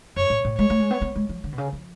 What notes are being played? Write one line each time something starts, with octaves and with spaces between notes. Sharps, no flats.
F#2 C#5
A2
A2
G#3 C#5
A3
G#3
B3
B3
G#3
F3
D3
B2
C#3
F3